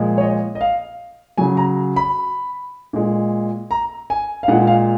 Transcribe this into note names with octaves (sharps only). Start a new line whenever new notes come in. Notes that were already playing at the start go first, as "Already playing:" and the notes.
Already playing: A#2 F3 G#3
C#5
D#5
D#5
F5
C#3 F#3 G#5
A#5
B5
A#2 G#3
A#5
G#5
F5
A#2 G#3 F#5
F5